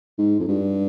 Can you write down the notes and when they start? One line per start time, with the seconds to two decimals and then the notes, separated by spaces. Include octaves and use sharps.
0.18 G#2
0.39 F2
0.48 G2